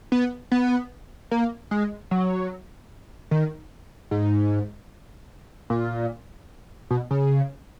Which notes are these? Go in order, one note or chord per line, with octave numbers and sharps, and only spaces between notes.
B3
B3
A#3
G#3
F#3
D#3
G#2
A#2
B2
C#3